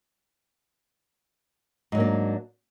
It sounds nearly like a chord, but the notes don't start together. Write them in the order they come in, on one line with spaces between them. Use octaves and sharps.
G#2 F#3 A#3 D4